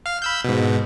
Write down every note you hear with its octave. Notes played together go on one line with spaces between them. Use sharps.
F5 F6
B5 E6 G6
G#2 B2